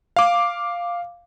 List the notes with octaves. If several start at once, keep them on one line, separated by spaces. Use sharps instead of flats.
F5 D6